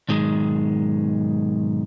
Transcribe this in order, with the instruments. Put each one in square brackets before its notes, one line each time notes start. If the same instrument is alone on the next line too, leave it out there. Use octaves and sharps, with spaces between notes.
[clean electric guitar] B1 G#2 D#3 G#3